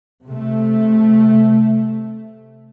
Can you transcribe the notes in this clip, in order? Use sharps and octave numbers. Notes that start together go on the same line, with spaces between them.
C3 A3